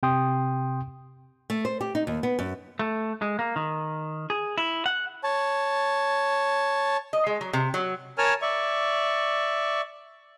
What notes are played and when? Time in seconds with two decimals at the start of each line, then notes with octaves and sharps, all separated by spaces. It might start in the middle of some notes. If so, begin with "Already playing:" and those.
0.03 C3 G5 C6 D#6
1.50 A3
1.65 C5
1.81 G4
1.95 D#4
2.07 D#2
2.23 B3
2.39 F#2
2.79 A3
3.22 G#3
3.39 A#3
3.56 D#3
4.30 G#4
4.58 E4
4.86 F#5
5.24 C#5 A5
7.13 D#5
7.27 G#3
7.41 F#3
7.53 C3
7.74 F#3
8.18 A#4 C#5 G#5 A5 F6
8.42 D5 E5 C#6